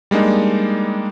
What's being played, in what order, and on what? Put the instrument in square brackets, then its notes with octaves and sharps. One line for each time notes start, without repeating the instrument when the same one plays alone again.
[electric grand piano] G3 G#3 A#3 D4 D#4